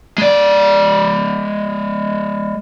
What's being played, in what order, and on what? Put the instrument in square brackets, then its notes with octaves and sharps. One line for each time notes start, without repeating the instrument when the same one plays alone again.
[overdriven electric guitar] G#3 D5